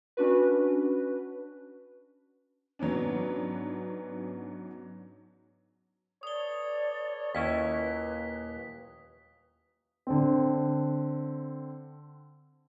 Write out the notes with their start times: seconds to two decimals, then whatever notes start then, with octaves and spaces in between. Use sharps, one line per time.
0.17 C#4 D4 F#4 B4
2.79 G#2 F#3 B3 C#4 D4
6.23 A4 B4 C#5 D5 D#6 G7
7.35 D#2 A#2 C#4 E4 B4 B6
10.07 D3 C4